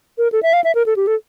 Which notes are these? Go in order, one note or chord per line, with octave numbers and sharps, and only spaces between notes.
A#4
A4
E5
F5
E5
A#4
A4
G4
A4